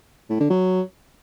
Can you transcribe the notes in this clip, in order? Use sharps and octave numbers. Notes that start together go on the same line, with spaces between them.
A2
D3
F#3